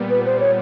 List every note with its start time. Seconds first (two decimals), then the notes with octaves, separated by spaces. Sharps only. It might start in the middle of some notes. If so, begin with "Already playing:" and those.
Already playing: A#2 G3 B3
0.09 B4
0.25 C5
0.39 C#5